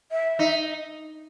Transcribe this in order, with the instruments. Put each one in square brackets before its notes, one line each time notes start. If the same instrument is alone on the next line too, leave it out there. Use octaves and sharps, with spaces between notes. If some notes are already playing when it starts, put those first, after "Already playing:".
[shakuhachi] E5
[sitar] D#4